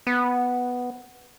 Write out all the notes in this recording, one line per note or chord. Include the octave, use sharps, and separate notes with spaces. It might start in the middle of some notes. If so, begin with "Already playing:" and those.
B3